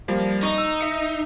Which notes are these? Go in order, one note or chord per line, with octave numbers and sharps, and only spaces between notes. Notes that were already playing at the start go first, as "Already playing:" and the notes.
F3 G3 A#3
D#4 C#6
E6
E5 C#7